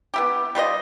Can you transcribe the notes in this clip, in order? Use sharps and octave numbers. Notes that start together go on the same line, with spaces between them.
B3 E4 G4
G3 F4 B4 D#5